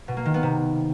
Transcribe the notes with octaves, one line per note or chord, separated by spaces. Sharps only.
B2
A#3
D#3
B3
C3